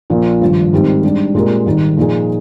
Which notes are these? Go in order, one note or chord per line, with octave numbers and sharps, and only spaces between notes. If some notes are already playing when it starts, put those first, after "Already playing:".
A#1 A#2 F3 A#3
G#1 G2 F3
G#2 D#3 G3 C4 G4
G#2 G3 D4
A#2 G#3 C4 G4 A#4
G#1 G#2 D#3 G3
A#2 F3 A#3 D#4 G#4